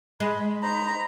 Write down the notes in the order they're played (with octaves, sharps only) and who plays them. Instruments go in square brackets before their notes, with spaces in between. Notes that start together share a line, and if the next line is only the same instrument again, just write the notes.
[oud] G#3 [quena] B5
[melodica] D#4 C5 [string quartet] A#5